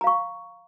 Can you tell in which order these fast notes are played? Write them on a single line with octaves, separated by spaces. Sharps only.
A#5 F5 C#6